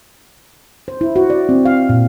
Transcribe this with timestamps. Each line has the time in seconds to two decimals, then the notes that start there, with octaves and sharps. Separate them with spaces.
0.88 C5
1.01 E4
1.16 F#4
1.30 D5
1.49 C4
1.65 F5
1.89 A#2